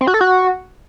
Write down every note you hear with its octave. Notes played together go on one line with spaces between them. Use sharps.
C4
F#4
A4
F#4